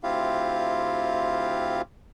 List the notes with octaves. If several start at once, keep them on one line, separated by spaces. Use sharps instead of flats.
D2 C4 E4 F4 G4 F5